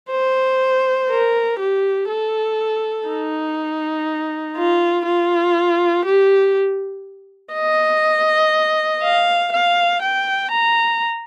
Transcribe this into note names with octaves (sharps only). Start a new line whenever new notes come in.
C5
A#4
G4
A4
D#4
F4
F4
G4
D#5
F5
F5
G5
A#5